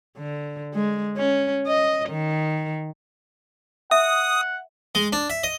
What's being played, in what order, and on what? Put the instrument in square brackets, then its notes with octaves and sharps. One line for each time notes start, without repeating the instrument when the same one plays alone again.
[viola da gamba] D3
G#3
C#4
D#5
D#3
[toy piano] E5 [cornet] F#5 [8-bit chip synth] D#6
[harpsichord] G#3
D4
E5
D#5